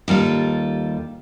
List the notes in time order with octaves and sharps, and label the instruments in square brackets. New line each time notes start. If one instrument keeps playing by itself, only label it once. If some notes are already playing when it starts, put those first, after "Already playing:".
[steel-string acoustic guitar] D#2 G3 F4 A4